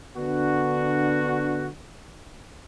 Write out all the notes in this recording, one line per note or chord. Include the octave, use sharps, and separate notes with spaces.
D3 B3 D4 F#4